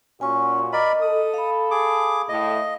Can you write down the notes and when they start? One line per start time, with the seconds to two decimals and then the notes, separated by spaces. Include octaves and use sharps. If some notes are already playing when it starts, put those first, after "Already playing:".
0.21 A#2 C#4 F#4 G#5 C#6
0.73 A#4 D5 D#5 B5
1.01 A4 D#6
1.34 F5 B5
1.71 G#4 D6
2.29 A2 D#5 F5